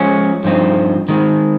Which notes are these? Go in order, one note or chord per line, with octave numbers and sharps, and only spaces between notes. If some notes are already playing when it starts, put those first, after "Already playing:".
Already playing: F3 G#3 C#4
G2 F3 C4 D#4
D#3 G#3 C4